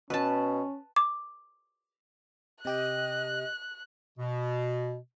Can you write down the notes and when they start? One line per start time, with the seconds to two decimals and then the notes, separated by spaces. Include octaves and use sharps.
0.10 B2 C#4 B4 A5
0.96 D6
2.65 C3 G4 D#5 G5 F#6
4.19 B2